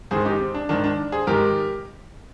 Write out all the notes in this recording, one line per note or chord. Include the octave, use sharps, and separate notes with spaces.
G#2 D#3 G#4 C5
D#4 G4
C4
D4
G#2 D#3 D4
D4
G#4 C5
G#2 D#3 G4 A#4